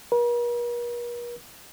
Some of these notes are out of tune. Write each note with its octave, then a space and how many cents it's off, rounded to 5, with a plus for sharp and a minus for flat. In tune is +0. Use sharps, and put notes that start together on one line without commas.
A#4 +45